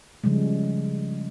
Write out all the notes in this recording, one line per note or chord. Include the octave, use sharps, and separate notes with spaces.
C#3 F3 G3 G#3